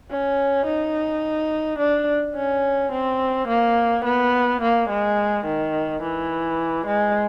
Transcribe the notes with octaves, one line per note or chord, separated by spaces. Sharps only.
C#4
D#4
D4
C#4
C4
A#3
B3
A#3
G#3
D#3
E3
G#3